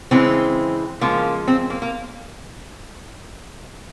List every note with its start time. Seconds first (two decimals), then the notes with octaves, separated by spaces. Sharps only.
0.11 C#3 E3 G#3 C4
1.01 C#3 F3 G#3 A#3
1.48 C4
1.70 A#3
1.82 A#3